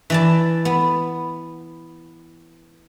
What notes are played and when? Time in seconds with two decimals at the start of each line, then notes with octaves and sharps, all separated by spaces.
0.10 E3 D5 A5
0.65 B3